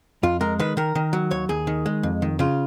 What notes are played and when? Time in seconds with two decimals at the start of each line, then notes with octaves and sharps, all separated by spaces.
0.23 F2 F4
0.41 G#3 A#4
0.60 D#3 B4
0.77 D#3 A#4
0.95 D#3
1.13 F#3
1.31 D#2 C#5
1.49 D#2 G#4
1.67 D#3
1.86 G#3
2.03 F2
2.22 D#3
2.39 C#3 F4